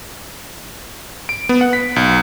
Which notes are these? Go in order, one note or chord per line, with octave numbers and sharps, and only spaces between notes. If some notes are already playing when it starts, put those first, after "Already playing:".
D7
B3
F#5
B6
B1